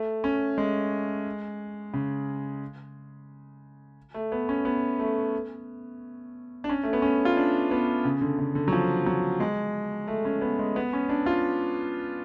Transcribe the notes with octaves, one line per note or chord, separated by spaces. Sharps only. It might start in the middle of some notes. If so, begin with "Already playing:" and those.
Already playing: A3
C#4
G#3
C#3
A3
B3
C#4
B3
A3
D4
C#4
A3
B3
C#4
F4
D4
B3
C#3
D3
C#3
D3
F#3
F3
F#3
G#3
A3
C#4
B3
G#3
B3
C#4
D4
F4